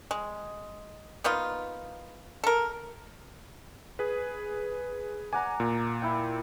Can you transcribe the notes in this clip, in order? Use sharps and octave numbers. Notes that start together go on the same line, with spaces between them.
G#3
A#3 B3 D#4 F4
A4 A#4
G#4 B4
D5 F#5 G#5 A#5
A#2
E4 G5